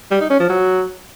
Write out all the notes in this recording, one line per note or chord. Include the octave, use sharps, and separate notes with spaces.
G3
D#4
C#4
F3
F#3